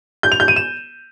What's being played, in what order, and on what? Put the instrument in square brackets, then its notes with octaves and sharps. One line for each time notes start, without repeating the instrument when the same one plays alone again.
[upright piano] G6
F7
G6
D#7
E7